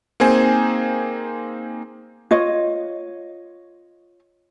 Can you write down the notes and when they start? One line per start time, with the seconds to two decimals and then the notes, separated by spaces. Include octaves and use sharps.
0.20 A#3 C4 D#4 G#4 C5 G#5
2.31 F4 C#5 D#5